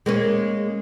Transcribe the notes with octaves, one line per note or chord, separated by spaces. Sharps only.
G#3 A#3 C#4